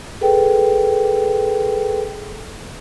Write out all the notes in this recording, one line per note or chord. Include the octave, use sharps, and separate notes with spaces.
G#4 A4 B4 G5